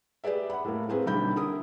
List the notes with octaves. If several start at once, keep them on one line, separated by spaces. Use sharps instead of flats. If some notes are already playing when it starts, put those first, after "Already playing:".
G4 G#4 B4 D5 E5
F#5 B5
A2 A#3
A#3 C4 G#4 B4
B1 D3 G3 E4 B5 G6
D3 E4 A#4 D#6